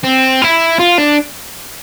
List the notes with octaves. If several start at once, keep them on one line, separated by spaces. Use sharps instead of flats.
C4
E4
F4
D4